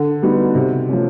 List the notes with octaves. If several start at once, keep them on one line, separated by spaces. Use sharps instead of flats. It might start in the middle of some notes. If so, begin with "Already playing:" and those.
Already playing: D3
G3 B3 D#4 F#4
C3
F3 A3 C#4